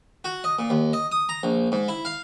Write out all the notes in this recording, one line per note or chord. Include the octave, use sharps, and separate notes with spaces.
F#4
D#5
A#2
D#2
D#5
D#6
A#5
A#1
G#2
E4
F5